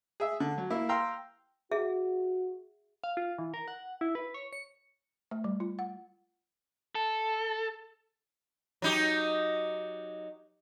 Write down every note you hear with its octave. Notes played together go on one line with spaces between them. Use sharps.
G#4 E5
D3
F#3
A#3 E4
F5 G5 A#5 C6 E6
F#4 G#4 E5
F5
F4
E3
A#4
F#5
E4
B4
C#5
C#7
A3
G3
F4
F#5
A4
F#3 D#4 G4